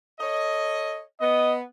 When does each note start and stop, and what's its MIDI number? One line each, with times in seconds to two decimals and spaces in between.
0.20 1.02 69
0.20 1.02 73
0.20 1.02 75
1.21 1.62 59
1.21 1.55 75